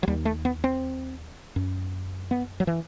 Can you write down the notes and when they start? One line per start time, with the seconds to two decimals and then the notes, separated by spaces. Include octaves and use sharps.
0.03 F#3
0.08 D#2 G3
0.25 A3
0.45 B3
0.64 C4
1.56 F#2
2.31 B3
2.60 F#3
2.67 E3